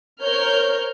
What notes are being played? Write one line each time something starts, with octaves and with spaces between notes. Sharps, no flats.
A#4 C5 C#5 F6 G6